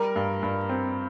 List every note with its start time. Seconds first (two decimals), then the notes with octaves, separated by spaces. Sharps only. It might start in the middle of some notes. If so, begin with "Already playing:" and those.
Already playing: G3 A#4
0.16 G2
0.43 G2
0.69 C4